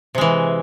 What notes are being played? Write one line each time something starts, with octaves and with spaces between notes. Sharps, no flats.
C3 E3 G#3